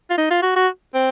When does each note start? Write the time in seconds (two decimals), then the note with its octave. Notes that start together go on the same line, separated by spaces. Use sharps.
0.10 F4
0.18 D#4
0.31 F4
0.42 F#4
0.56 F#4
0.94 C4